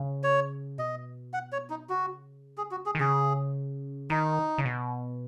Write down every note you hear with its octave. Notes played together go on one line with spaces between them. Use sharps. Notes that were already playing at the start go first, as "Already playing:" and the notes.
Already playing: C#3
C#5
B2 D#5
F#5
C#5
D#4
C#3 F#4
G#4
F#4
G#4
D#3
C#3 G#4
D#3 D#4
C#3
B2